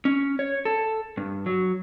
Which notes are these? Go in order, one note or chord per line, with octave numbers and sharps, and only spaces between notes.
C#4
C#5
A4
G2
F#3